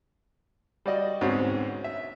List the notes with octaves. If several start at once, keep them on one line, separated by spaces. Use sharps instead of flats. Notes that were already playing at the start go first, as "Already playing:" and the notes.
G3 F#4 D5 D#5
D2 G#2 B2 C4 C#4
E5